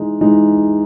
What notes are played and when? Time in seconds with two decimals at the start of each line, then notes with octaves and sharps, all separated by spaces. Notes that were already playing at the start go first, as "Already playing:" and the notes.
Already playing: E3 G#3 D#4
0.21 E3 G#3 D#4